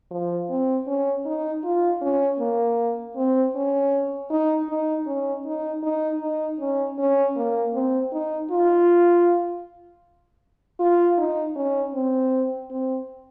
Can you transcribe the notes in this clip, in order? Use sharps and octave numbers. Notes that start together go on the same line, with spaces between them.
F3
C4
C#4
D#4
F4
C#4
A#3
C4
C#4
D#4
D#4
C#4
D#4
D#4
D#4
C#4
C#4
A#3
C4
D#4
F4
F4
D#4
C#4
C4
C4